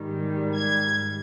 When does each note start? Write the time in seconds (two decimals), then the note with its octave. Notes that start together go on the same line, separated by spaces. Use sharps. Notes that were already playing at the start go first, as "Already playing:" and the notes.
Already playing: G#2 D#3 G3
0.56 G#6